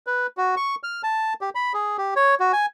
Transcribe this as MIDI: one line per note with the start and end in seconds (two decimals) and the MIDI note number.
0.07 0.27 71
0.37 0.55 66
0.57 0.75 85
0.83 1.02 89
1.03 1.34 81
1.41 1.50 67
1.55 1.73 83
1.74 1.97 68
1.98 2.14 67
2.16 2.35 73
2.40 2.52 66
2.53 2.66 80